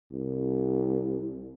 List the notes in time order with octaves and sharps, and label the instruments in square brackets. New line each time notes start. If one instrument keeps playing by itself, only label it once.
[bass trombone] C2